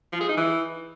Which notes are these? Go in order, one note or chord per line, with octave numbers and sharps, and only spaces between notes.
F3
G#4
D#4
E3